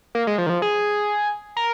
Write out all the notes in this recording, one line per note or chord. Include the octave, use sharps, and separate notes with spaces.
A#3
G#3
F3
D#3
F3
G#4
A#4